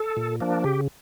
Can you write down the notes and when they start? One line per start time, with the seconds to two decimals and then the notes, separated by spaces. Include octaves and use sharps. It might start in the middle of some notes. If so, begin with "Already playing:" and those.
Already playing: A4
0.17 A#2
0.41 F3 A#3 D4
0.64 C#3 G4